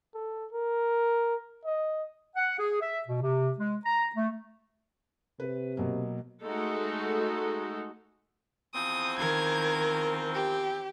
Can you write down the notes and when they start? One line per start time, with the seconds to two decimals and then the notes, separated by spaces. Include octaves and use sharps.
0.15 A4
0.53 A#4
1.65 D#5
2.36 F#5
2.59 G#4
2.81 E5
3.07 B2
3.22 C3
3.58 G#3
3.86 A#5
4.15 A3
5.40 C3 B4
5.77 B2 F#3 A#3
6.43 G#3 A3 D#4 F#4 A4
8.74 E2 F3 C4 D#6
9.19 D#3 A#4 G#6
10.35 G4